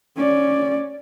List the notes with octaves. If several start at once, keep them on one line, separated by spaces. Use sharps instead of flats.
C#4 D5